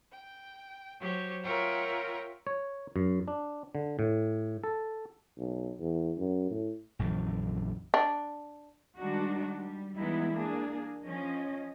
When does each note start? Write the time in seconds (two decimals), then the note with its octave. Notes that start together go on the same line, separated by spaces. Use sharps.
0.11 G5
1.00 F#3 G4 C5 C#5
1.43 F4 A#4 C#5 E5 F#5 G5
2.47 C#5
2.96 F#2
3.28 D4
3.75 D3
3.99 A2
4.64 A4
5.38 B1
5.80 E2
6.17 F#2
6.51 A2
6.99 A#1 F#2 D3 E3
7.94 D4
8.99 D#3 G3 G#3 D4 D#4 F#4
9.60 G3
9.97 E3 G3 G#3 B3 D#4 E4
10.33 A#3 D4 G#4
11.05 F3 C#4 D#5